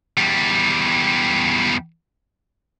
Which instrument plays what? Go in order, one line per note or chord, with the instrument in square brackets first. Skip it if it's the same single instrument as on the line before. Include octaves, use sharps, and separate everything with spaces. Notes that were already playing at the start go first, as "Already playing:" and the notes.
[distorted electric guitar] E2 G3